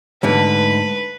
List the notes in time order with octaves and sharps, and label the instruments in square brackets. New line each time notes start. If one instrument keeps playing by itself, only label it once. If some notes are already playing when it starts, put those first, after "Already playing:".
[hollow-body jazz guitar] D2 G#2 D3 [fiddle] B4